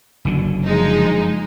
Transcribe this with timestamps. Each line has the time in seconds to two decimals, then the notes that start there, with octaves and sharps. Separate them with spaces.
0.25 F#1 D3 F#3
0.65 F3 G#3 D#4